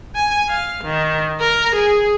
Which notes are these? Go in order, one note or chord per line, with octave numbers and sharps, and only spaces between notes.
G#5
F5
D#3
A#4
G#4